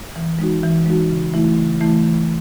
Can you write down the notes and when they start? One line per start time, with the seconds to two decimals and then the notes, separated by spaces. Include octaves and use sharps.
0.16 E3
0.39 G#3 D#4 F#4
0.63 E3
0.86 G#3 D#4 F#4
1.10 C#3
1.34 E3 A3 E4
1.57 C#3
1.80 E3 A3 E4
2.03 E3